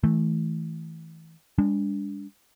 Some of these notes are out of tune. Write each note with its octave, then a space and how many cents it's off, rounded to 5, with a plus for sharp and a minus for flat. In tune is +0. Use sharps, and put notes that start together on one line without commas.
E3 -30 A3 -10
G#3 -45 D4 -25